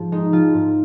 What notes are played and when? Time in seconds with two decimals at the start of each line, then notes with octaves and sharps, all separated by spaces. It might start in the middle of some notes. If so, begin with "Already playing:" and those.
Already playing: G#2 F3
0.12 G#3 D#4
0.32 F3 F4
0.54 G#2